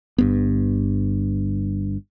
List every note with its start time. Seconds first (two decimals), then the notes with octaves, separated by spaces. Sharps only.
0.18 G1 G2 B3